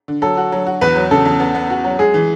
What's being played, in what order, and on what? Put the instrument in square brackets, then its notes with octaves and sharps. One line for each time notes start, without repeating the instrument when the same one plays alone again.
[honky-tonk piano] D3
[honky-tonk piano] F#3 [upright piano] A4
[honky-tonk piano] F#4
F#3
F#4
[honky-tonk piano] E2 [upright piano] B4
[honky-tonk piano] F#3
[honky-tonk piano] C#3 [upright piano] A4
[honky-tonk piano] E2
B3
B3
F#4
F#3
[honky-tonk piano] G#3 [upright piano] G#4
[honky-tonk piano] E3